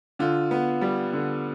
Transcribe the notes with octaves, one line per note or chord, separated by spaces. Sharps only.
D3 F4
B3
G3
D3